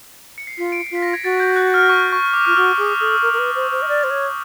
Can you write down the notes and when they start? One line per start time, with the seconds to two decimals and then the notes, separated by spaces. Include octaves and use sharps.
0.38 C#7
0.47 C7
0.58 F4 B6
0.72 D7
0.80 C#7
0.87 C7
0.91 F4 B6
1.02 A#6
1.13 G#6
1.24 F#4 A6
1.40 G6
1.56 F#6
1.74 F6
1.89 C#6
2.12 C#6
2.34 D6
2.45 F4 F6
2.56 F#4 E6
2.78 G#4 D6
3.00 A4 D#6
3.22 A#4
3.33 A#4
3.39 B4
3.55 C5
3.71 C5
3.82 D#5
3.88 D5
4.04 C5
4.10 C#5